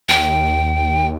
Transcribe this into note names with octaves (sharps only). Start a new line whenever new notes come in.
D#2 G5